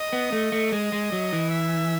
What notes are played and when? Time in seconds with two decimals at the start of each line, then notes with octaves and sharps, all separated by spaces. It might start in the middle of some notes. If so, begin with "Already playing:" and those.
Already playing: D#5
0.13 B3
0.32 A3
0.52 A3
0.72 G#3 D#5
0.92 G#3
1.12 F#3
1.33 E3
1.52 E5